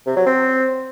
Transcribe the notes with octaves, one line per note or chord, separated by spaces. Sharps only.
C3
F#3
C4